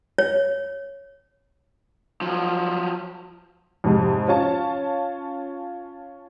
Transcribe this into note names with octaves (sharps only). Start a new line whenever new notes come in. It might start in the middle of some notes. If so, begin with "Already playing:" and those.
C#5
F3 F#3
F2 G#2 C3 G#3
C#4 F4 C#5 A5